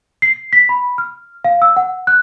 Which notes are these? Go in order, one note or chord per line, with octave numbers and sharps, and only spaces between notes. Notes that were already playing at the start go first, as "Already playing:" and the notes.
C7
B6
B5
F6
F5
E6
F#5
F#6